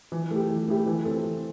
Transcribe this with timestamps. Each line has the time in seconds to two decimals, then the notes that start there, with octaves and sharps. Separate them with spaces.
0.12 E3
0.31 A3 E4 G4
0.50 E3
0.68 A3 E4 G4
0.86 E3
1.05 C4 A4
1.24 E3